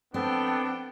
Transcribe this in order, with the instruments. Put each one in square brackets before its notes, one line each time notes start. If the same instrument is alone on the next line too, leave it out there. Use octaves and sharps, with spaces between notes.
[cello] F3 G5 [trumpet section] B3 D4 [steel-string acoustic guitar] C4 [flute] A4